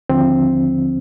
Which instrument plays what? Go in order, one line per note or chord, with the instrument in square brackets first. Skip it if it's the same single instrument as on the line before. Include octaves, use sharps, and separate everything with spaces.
[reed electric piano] D#2 D3 F3 C4